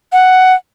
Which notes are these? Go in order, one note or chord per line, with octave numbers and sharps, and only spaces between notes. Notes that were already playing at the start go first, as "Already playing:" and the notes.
F#5